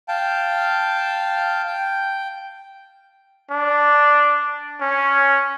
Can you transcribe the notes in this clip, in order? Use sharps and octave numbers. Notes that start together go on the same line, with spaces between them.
F5 G5 A5
G5
D4
C#4